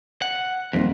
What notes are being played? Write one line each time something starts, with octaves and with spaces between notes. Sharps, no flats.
F#5
D#1 F2